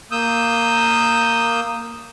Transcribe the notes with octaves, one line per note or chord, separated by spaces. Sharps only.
A#3 D#6 E6 G6